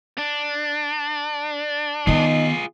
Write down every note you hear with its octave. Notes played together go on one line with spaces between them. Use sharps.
D4
D#3 B3 D#4 F4 G#4